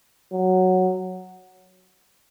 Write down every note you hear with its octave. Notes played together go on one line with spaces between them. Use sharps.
F#3